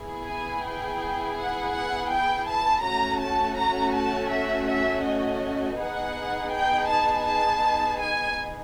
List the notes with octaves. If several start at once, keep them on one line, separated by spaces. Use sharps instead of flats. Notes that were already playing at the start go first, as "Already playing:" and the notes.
Already playing: B3 E4 G#4
G#5
G5
F#5
F#5
G5
A5
A3 C#4 F#4 A#5
A5
A#5
A5
E5
E5
D#5
B3 D#4 G#4 F#5
G5
A5
A5
G#5